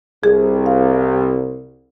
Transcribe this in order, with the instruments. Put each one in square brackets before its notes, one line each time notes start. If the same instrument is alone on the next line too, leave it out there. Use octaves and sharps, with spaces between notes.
[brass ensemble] C2 [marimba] G#4
[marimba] F5